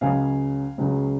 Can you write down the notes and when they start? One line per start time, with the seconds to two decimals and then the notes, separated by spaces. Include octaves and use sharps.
0.01 C#2 C#3 F#3 F5 G#5
0.78 C#2 C#3 F#3